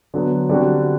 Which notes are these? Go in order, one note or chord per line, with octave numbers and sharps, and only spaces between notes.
D3 F#3 B3
D3 G3 C4 F#4